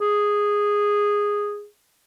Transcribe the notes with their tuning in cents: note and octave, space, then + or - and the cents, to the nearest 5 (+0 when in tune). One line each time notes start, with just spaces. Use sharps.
G#4 -10